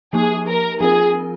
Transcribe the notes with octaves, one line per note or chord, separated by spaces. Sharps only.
F3 A#3 D#4 G4 G#4
A#4
F3 C4 F4 G#4 A#4